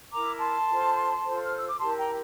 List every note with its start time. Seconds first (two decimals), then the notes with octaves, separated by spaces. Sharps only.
0.13 E4 A#4 A#5 D6
0.40 A5 C6
0.68 F4 A4 C5
1.24 F4 A4 C5
1.44 F6
1.57 E6
1.68 D6
1.79 E4 G4 A#4 A5 C6
1.98 G5 A#5